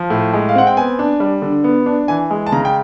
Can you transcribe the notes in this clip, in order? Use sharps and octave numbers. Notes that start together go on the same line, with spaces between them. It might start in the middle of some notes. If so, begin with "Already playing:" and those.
Already playing: F3
A2
G#3
F5
C4 F#5
G5
B3 G#5
D4
G3
D3
B3
D4
E3 G#5
G#3
A5
C#3 A#5
G5